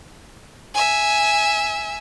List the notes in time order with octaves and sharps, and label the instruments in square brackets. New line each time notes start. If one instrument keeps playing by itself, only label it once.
[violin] E5 G#5